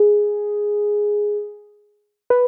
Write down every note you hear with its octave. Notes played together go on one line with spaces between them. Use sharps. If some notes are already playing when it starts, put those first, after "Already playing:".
Already playing: G#4
B4